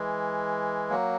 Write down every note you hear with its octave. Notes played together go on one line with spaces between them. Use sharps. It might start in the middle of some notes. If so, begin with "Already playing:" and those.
Already playing: E3 G#3
F#3 A#3